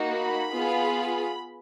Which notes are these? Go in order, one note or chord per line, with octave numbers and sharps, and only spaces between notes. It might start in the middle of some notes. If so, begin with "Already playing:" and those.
Already playing: A#3 D#4 F#4
B5
B3 F4 G#4